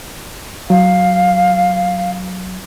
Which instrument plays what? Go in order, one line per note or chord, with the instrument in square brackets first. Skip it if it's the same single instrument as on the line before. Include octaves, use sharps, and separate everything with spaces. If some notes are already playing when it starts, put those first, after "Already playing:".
[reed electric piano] F#3 [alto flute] F5